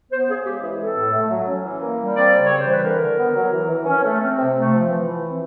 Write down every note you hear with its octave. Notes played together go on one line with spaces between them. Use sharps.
B3 C5
C#3 G#4
G#3 G4
E3 G#4
C4 A4
A2
A3
F#3
C#4
E3
A#3
G3
C4 D5
C#3
C#5
G3
C5
E3 B4
D3 A#4
D3
B3
F#3
E3
E3
C#4
A3
C4
C3
A3
F3
E3
E3
C4